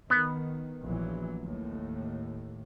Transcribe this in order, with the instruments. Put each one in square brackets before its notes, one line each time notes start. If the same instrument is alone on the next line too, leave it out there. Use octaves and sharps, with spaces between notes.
[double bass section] D#3 [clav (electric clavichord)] B3
[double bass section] A#1 E3 F#3
D#2 A2